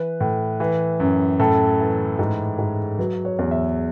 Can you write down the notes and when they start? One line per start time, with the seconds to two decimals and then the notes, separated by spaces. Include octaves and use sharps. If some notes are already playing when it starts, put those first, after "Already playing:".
Already playing: E3 B4
0.20 A2
0.60 E3
1.00 F#2
1.40 A2 A4
1.80 E3
2.19 G#2
2.59 G#2
2.98 F#3 B4
3.25 C#5
3.39 E2
3.51 E5